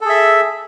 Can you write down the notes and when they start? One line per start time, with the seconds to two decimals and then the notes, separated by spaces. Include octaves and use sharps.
0.01 A4
0.05 G#4
0.10 E5